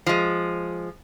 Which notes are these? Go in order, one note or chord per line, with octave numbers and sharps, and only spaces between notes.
F3 G#3